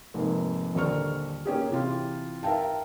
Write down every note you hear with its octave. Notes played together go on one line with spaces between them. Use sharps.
F1 G#2 A#3
D#1 D3 A#4 C#6 F6
A#3 C#4 G4 G#4
C3 E3 F4
A#4 E5 F5 G5 A5